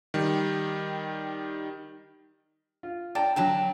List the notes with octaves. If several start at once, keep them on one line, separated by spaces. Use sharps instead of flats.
D#3 G3
F4
D5 G5 A5 A#5
D3 F#3 G5 A5 A#5